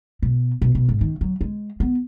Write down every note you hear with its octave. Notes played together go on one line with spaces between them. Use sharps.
B2
B2
B2
G#2
D#3
F#3
G#3
B3